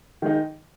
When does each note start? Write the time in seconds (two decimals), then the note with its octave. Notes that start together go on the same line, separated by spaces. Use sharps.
0.22 D#3 G#3 D#4